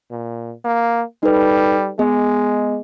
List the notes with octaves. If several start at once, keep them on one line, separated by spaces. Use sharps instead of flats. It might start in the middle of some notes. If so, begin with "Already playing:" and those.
A#2
A#3
G3 D#4 A4 B4
G#3 B3 G#4 D#5